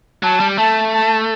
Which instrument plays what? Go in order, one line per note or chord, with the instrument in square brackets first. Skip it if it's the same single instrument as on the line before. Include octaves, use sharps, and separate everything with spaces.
[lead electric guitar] F#3 [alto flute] A5
[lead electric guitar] G3
[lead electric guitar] A3 [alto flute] A5
[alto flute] A5